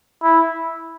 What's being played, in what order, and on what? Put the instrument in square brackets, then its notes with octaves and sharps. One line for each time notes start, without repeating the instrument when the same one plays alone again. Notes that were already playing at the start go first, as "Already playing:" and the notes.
[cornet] E4